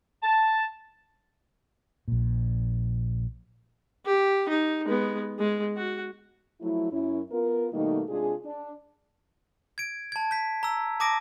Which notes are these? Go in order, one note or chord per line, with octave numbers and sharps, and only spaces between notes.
A5
A#1 A#2
G4
D#4
G#3 B3
G#3
F#4
F3 F#3 A3 E4
F#2 C#4 E4
B3 F4 A#4
B2 D#3 G3 A3 A#3 D#4
C3 G#3 D4 F4 G#4
D4
G#6 D7
A5 G#6
G6 B6
A#5 E6
A5 D6 D#6 A#6 D7